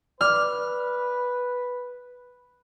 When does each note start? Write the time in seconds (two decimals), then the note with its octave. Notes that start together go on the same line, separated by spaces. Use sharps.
0.21 B4 D5 D6 F6